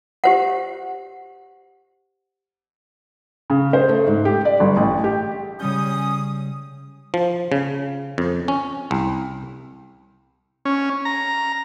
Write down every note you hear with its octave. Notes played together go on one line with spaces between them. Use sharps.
G4 C5 F#5
C#3
C5
A3
G#2
G4
D5
G1
A1
G4
C#3 G3 C#4 D#6 G6
F3
C#3
F2
C#4
C2
C#4
A#5